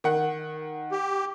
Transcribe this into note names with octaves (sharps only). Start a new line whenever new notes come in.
D#3 F#5
G4